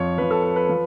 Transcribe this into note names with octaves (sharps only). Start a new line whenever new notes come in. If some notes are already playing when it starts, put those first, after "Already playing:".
Already playing: F2 F3 C#5
F2 F3 B4
A4
B4
B4
F3